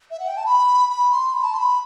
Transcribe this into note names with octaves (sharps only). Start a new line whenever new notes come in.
E5
F#5
G5
A5
B5
B5
C6
B5
A5
C6
B5